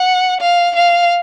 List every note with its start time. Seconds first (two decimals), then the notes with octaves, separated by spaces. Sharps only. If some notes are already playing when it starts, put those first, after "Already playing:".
Already playing: F#5
0.41 F5
0.75 F5